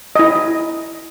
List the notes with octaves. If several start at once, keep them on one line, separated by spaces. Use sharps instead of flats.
E4 D#5